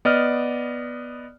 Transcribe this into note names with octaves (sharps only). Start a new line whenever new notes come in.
B3 D5 D#5 F6